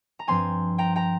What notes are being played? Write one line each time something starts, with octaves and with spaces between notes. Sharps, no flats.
A#5
G2 F3 C4 G#5 C6
G5 A#5
G5 A#5